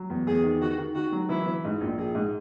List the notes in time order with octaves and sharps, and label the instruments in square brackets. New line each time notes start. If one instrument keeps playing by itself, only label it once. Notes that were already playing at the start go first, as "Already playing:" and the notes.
Already playing: [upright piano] F#3
E2
[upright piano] E2 [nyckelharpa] G#4
[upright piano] D#3
[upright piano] D#3 [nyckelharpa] F#4
[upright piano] D#3
[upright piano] D#3 [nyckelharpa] F#4
[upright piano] F#3
[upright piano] E3 [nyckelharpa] E4
[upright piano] E3
G#2
A#1
[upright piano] A#1 [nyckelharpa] G#4
[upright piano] G#2